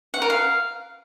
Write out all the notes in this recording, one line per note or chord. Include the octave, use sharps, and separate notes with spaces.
F#5
A#4
F5